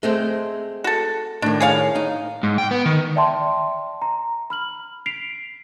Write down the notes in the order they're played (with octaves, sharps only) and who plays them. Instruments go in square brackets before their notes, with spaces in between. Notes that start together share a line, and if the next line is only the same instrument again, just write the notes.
[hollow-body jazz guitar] G#3 A3 C4
[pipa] F#4 A4
[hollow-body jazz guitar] A2 D#3 [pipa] D4
[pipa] G#4 C#5 F5
[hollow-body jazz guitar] D#4
[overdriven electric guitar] G#2
G5
B3
D#3
[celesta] D5 E5 G5 A5 C6
A#5
B5 F6 F#7
B6 C7 D7 F7